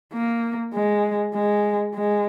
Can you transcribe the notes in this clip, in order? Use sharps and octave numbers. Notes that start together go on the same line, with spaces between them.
A#3
G#3
G#3
G#3